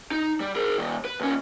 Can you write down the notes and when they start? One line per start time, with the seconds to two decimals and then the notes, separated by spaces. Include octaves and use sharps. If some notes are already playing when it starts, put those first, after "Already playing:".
0.11 D#4
0.40 G3
0.56 G#4 A#4
0.78 D#3 G3
1.05 B4
1.20 D#2 C#4